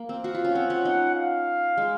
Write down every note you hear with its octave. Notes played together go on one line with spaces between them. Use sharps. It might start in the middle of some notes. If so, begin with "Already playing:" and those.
Already playing: A#3
C4
F#4 F5
F4
C#4
C4 F#5
C#4
D#4
F5
G#3